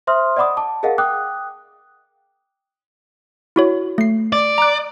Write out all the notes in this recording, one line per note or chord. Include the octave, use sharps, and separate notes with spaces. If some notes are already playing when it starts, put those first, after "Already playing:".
C5 E5 C6 D#6 F6
D5 D#5 F#5 B5 D6 D#6
A5 D6
G#4 A#4 D#5 F5 F#5
G5 D6 D#6 F#6
E4 F#4 C#5
A3 C7
D5
A#5 F#6